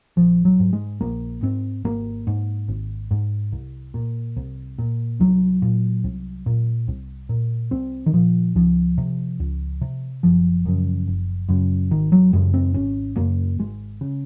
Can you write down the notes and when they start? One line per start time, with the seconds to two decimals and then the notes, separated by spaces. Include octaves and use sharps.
0.17 A#1 F3
0.45 F#3
0.60 G#2
0.73 G#3
1.01 A#1 A#3
1.43 G#2 C4
1.85 G#1 A#3
2.27 G#2
2.68 G#1
3.11 G#2
3.52 C2
3.94 A#2
4.37 C2
4.79 A#2
5.20 C2 F#3
5.62 A#2
6.04 C2
6.46 A#2
6.88 C2
7.29 A#2
7.71 C2 C4
8.06 D#3
8.13 A#2 F3
8.56 C#2 F3
8.98 C3
9.40 C#2
9.81 C3
10.23 F#1 F3
10.65 F#2 C#3
11.07 F#1
11.49 F#2 C#3
11.91 G#1 D#3
12.12 F#3
12.33 F#2 C#3 G#3
12.54 C4
12.74 G#1 C#4
13.17 F#2 C#3 A#3
13.59 G#1 G#3
14.01 C#3